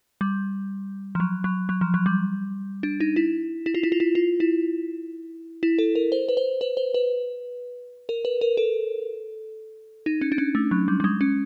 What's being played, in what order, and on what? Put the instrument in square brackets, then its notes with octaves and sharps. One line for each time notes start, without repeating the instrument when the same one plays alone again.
[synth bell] G3
F3
F#3
F#3
F#3
F3
F#3
G3
D4
D#4
E4
E4
F4
E4
F4
E4
F4
E4
E4
A4
A#4
C5
B4
C5
B4
C5
B4
A#4
B4
A#4
A4
D#4
C#4
D4
C#4
A3
F#3
G3
G3
G#3
C#4